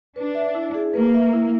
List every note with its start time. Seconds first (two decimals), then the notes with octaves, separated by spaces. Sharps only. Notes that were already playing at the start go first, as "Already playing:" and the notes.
0.16 D4 B4
0.35 E5
0.55 E4
0.75 G#4
0.94 A#3 B4
1.14 E5
1.33 E4